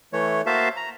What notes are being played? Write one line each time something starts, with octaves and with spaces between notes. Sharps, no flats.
E3 A3 C#5
A#3 F#4 C5 E5 F5 A5
A#5